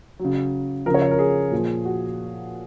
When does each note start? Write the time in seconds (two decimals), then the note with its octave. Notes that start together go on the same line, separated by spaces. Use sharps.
0.19 F#3
0.25 C#3
0.86 F3 A#4
0.90 C#3 C#5
1.02 C#5
1.11 A#4
1.19 G#4
1.51 A#2
1.57 F3
1.85 F#4